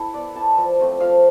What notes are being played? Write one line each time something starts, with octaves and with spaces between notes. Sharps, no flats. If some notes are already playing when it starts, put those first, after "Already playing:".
Already playing: E4 A4
B3 D5
E4 A5
F3
A3 C4 F4
F3 F5